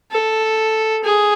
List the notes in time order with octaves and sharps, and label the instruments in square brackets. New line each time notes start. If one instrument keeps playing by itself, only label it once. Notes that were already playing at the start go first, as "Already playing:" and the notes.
[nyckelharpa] A4
G#4